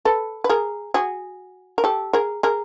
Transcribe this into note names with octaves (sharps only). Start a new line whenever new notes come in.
A4 B4
B4
G#4 A#4
F#4 G#4
A#4
G4 A4
G#4 A#4
G#4 A#4